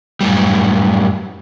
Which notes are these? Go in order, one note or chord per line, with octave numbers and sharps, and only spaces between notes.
F#2 A2 G3